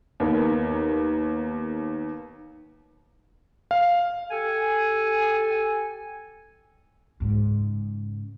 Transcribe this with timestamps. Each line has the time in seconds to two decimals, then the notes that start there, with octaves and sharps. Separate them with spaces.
0.20 D#2 B3 A#4
3.71 F5
4.31 G4 A4 G#5
7.20 G#2 C#3